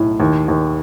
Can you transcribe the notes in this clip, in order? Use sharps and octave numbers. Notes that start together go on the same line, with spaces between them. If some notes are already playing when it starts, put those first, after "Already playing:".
Already playing: B1 A2
D#2
D#2